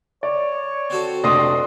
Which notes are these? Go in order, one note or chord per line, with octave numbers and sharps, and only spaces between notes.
C#5 D5
C4 F#4 A4
F1 D4 D#5 C6 D#6